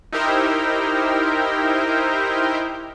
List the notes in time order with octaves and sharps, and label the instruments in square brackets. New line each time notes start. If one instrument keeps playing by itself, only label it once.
[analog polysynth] D#4 E4 G4 A#4 C5 G5